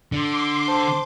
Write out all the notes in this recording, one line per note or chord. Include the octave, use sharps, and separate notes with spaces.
D3 C6 D6
C5 A5